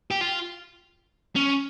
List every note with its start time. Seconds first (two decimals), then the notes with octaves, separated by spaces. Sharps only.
0.11 G4
0.21 F4
1.36 C#4